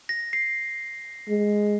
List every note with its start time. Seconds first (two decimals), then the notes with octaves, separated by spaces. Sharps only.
0.09 A#6
0.33 C7
1.29 G#3